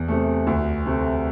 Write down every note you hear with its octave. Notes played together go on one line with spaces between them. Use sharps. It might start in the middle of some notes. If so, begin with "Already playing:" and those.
Already playing: E2
C3 A3
D2
C3 A3